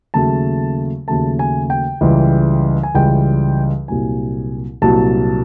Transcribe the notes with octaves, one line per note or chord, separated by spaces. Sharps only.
D#2 C#3 F#3 A3 A5
D#2 C#3 F#3 A3 A5
G#5
G5
C#2 C#3 E3 G3
G#5
C#2 C#3 E3 G3 G5
C2 A#2 F#3 G#5
C2 A#2 F#3 A5